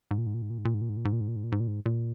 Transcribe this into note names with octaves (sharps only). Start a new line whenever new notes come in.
G#2
A#2
G#2
A#2
G#2
A#2
G#2
A#2
G#2
A#2
G#2
A#2
G#2
A#2
G#2
A#2
G#2
A#2
G#2
A#2
G#2
A#2